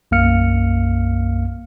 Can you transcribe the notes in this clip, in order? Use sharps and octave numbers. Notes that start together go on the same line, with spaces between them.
B1 F#2 A#3 F5 F6 C#7